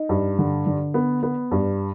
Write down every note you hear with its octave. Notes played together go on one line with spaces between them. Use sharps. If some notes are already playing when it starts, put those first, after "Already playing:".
Already playing: D#4
G2
D3
D3
B3
B3
G2